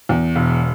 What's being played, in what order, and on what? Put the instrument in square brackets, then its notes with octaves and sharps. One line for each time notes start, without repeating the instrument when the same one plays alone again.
[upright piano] E2
E1